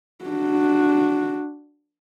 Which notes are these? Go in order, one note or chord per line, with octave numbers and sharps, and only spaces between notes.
D4 F#4